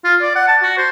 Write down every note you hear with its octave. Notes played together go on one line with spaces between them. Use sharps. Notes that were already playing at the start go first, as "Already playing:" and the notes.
F4
D5
F#5
A5
F#4
C5